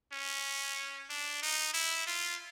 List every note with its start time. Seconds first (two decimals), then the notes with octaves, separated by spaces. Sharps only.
0.13 C#4
1.10 D4
1.43 D#4
1.74 E4
2.07 F4